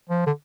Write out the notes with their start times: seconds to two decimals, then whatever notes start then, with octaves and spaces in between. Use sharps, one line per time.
0.10 F3
0.27 D3